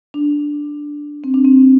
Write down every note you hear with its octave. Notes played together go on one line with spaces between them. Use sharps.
D4
C4
D4
C4